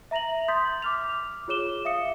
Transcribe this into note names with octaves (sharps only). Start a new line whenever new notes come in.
E5 A#5 A#6 F7 F#7
C6 D#6 G6 A6 B6
D6 F6 F7
F4 G#4 C#5 D6 E7 G7
E5 F5 D#6 C#7